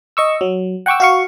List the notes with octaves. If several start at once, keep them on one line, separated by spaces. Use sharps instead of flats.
D#5 C#6 E6
F#3
F#5 G5 C#6 D6 E6
F#4 F5 C#6